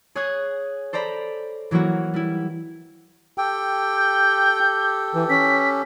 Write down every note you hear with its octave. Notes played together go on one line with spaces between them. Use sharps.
G#4 C#5 D#6 F#6 G#6
A4 C5 D5 A#5 B5
E3 F#3 A#3 E4 F#4
G3 E4
G4 A4 G5
G6
E3
C#4 B6